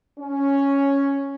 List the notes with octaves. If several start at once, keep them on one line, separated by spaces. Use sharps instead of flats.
C#4